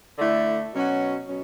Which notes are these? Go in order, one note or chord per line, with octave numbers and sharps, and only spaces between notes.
D3 A3 E4 A4
B2 F#3 C#4 F#4
B2 F#3 C#4